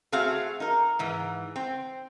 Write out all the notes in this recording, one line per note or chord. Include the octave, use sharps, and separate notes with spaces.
A3 C4 F#4 G#4 F5
D#4 A#4
G#2 E3
C4